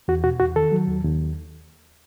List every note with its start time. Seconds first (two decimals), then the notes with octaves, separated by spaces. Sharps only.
0.08 E2 F#4
0.24 B2 F#4
0.40 E2 F#4
0.56 D#3 A4
0.72 F#3
0.88 D#2
1.04 D#2